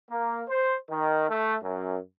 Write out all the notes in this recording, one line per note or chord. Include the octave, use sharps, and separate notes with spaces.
A#3
C5
D#3
A3
F#2